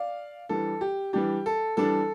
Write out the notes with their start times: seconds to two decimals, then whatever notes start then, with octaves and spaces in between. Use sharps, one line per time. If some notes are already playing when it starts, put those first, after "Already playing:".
Already playing: D5 F5
0.49 E3 G3 D4 A4
0.81 G4
1.13 E3 G3 D4 G4
1.46 A4
1.77 E3 G3 D4 A4